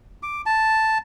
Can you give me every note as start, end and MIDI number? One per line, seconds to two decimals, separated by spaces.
0.23 0.42 86
0.46 0.98 81